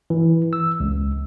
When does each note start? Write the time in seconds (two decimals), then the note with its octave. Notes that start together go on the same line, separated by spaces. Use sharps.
0.10 E3
0.53 E6
0.80 C#2